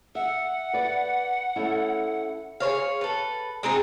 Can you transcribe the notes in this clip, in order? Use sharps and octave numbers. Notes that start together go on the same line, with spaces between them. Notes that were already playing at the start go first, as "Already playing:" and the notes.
E5 F#5
B4 D5
A3 C#4 E4
G#4 C5 C#5 F5
A4 B4
G#3 C4 D#4 G#4